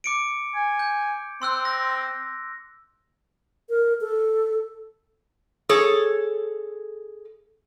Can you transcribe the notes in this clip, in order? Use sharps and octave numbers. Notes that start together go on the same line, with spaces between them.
D6 C#7 D7
G#5
G6
C4 C6 E6 F#6
A#6
A#4
A4
G#4 A4 C#5